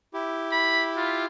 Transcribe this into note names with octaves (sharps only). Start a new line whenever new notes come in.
E4 G4
B5
F4